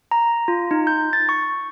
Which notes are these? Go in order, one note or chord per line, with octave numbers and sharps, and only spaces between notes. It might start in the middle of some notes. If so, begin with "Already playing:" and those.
A#5
F4
D#4
G6
A6
C#6